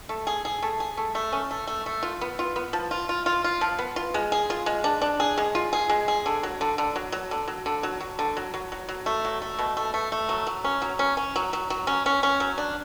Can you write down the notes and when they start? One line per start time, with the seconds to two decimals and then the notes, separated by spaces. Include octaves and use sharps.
0.09 A3
0.27 G#4
0.45 G#4
0.62 A3
0.80 G#4
0.97 A3
1.15 A3
1.33 C#4
1.51 A3
1.67 A3
1.86 A3
2.03 F4
2.21 B3
2.39 F4
2.56 B3
2.73 F3
2.91 F4
3.09 F4
3.26 F4
3.44 F4
3.61 F3
3.78 B3
3.96 F4
4.14 G#3
4.32 G#4
4.50 F4
4.66 G#3
4.84 D4
5.01 D4
5.20 G#4
5.38 G#3
5.55 F4
5.73 G#4
5.89 G#3
6.08 G#4
6.26 D3
6.43 F#3
6.61 D3
6.78 D3
6.96 F#3
7.12 F#3
7.31 D3
7.48 F#3
7.66 D3
7.83 F#3
8.00 F#3
8.19 D3
8.37 F#3
8.54 F#3
8.72 F#3
8.89 F#3
9.06 A3
9.25 F#3
9.42 A3
9.59 B2
9.77 A3
9.94 A3
10.12 A3
10.29 F#3
10.47 F#3
10.64 C#4
10.82 F#3
10.99 C#4
11.17 C#4
11.36 F#3
11.53 F#3
11.70 F#3
11.87 C#4
12.06 C#4
12.23 C#4
12.40 F#3
12.58 D4